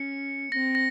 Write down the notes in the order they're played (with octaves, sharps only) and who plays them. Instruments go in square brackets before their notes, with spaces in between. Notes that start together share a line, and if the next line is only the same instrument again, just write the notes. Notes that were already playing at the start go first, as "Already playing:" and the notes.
Already playing: [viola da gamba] C#4 [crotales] C#7
[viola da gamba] C4 [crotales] A#6
[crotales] A#6